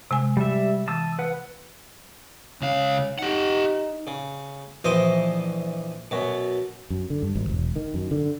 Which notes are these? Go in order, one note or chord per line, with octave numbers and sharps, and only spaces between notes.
C3 G#3 G#5
G3 E5
E3 A5 D#6 E6
B4 F#5
C#2 C#4 F5
D#4 G4 F#5
C#3
A#1 E3 C5 D#5 C6 D#6
F#2 B2
F#2
D3
G2
G#1
E1
D#3
F#2
D3